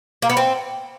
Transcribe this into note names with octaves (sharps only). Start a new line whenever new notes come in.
A#3
B3
C4